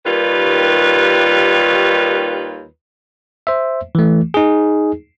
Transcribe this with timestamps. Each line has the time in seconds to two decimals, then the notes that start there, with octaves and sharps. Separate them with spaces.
0.05 D#2 D#3 G3 F4 B4
3.47 C5 E5
3.95 E3 A3
4.34 D#4 G#4